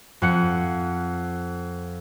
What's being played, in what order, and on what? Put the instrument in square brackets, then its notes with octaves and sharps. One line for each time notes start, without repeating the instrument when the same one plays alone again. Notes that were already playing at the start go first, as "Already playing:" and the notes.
[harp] F2 F#5 C#7